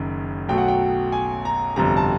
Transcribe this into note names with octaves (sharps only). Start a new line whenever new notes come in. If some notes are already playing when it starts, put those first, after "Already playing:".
Already playing: F#1 F#2 D#3
B1 B2 F#3 A3 G5
F#5
G5
G#5
A#5
G1 F2 C3 A#5
A5